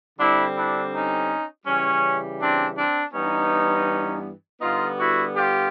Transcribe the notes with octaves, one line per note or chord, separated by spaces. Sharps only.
D3 G3 C4 D4 E4
D4 E4
C#4 D#4
C#3 E3 G3 C#4
C4 D4
C4 D4
G2 E3 G3 B3 C#4 D#4
D3 G3 B3 D#4 F4
E4 F#4
F4 G4